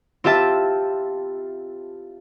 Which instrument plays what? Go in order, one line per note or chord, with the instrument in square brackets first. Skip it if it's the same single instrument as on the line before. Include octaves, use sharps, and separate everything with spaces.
[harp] C4 F4 G4 E5 A5